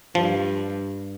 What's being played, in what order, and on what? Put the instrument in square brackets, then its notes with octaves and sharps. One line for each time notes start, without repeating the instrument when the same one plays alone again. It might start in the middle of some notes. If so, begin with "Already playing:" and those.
[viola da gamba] G2 [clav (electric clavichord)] F3